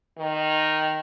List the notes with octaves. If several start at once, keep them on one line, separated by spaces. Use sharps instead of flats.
D#3